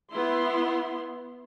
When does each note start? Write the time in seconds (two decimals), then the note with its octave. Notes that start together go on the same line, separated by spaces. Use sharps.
0.13 B3 E4 C6